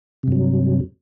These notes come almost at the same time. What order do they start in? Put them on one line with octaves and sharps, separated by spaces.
C3 G2 F#3